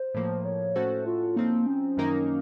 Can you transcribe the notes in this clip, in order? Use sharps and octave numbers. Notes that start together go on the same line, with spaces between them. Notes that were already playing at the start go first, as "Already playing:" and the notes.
Already playing: C5
A2 F3 A#3
C#5
A2 A3 C#4 F#4 A4 C5
F4
F3 A#3 C4 D#4
C#4
F#2 D#3 A#3 D#4 A#4